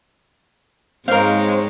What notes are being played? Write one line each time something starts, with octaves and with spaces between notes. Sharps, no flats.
G#2 G#3 C4 A#4 C5 C#5 F5